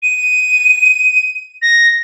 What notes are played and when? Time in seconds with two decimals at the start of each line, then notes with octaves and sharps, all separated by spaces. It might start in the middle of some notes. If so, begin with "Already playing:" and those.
0.02 D#7
1.61 A#6